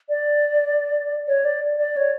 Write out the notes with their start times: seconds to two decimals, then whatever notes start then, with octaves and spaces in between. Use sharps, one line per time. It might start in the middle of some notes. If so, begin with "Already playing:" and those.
0.09 D5
1.27 C#5
1.44 D5
1.78 D5
1.96 C#5